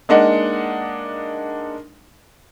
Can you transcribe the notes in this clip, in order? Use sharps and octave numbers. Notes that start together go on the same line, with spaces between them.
G#3 A#3 D4 D#4 D#5 F#5